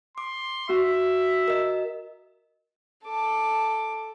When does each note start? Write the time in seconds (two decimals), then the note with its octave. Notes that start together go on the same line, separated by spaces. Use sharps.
0.18 C6 D6
0.69 F#4 E5
1.48 A#4 D#5
3.04 A4 D6